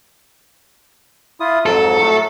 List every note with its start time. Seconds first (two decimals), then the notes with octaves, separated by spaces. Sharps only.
1.40 E4 F4 D#6
1.66 F2 G#2 F#3 A4
2.00 A2 F#3 A3